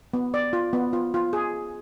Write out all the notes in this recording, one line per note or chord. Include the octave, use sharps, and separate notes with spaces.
B3
D5
F4
B3
F4
F4
G#4